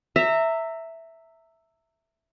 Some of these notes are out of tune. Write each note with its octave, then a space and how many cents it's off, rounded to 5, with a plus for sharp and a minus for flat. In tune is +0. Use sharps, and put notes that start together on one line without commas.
E5 +0 A#5 -30